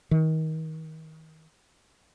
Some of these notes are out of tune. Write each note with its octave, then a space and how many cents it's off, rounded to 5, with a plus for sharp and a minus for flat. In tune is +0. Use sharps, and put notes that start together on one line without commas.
D#3 +30